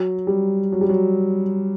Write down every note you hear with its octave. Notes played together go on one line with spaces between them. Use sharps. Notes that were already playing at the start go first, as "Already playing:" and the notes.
Already playing: F#3
G3
F#3
G3
F#3